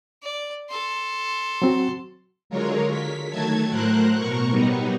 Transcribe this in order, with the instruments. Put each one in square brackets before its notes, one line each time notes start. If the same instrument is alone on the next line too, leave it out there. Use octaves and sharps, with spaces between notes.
[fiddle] D5
A4 C6
[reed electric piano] F#3 C4 F#4
[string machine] D3 F#3 G#3 F4 A#4 C#5
B6
D#3 F#3 A3 A5 G#6
A2 F#3 A#4 C5 F#6
B2 A#4 C#6
F#3 G3 B3 D#4